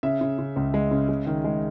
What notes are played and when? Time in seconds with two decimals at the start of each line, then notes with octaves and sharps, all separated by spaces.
0.03 C#3 E5
0.21 C#3
0.38 C#3
0.56 C#2
0.74 G#3
0.91 C#3
1.09 G#3
1.27 D#3
1.44 G#3